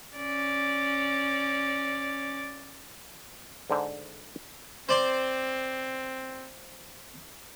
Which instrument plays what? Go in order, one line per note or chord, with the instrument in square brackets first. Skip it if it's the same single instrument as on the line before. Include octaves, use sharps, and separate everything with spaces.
[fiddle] C#4 D5
[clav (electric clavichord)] G#2 D3 C5
[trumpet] C4 [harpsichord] C5 D5 C6